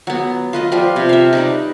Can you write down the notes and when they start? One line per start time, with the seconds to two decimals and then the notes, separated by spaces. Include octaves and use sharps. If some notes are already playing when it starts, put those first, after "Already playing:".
0.07 F#3 B3
0.53 F4 B4 D#5
0.72 F3 G3 F4
0.96 C3
1.09 E5 F5
1.33 D#4 B4 D5